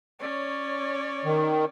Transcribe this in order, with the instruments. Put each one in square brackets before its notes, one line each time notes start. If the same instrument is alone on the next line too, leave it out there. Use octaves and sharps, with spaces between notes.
[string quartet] C#4 C#5 D5
[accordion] D#3